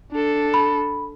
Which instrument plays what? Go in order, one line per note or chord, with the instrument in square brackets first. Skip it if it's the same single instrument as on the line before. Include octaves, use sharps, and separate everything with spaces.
[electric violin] D4 A4
[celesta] B5